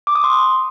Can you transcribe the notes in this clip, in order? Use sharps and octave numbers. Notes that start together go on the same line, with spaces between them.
D6
D#6
C6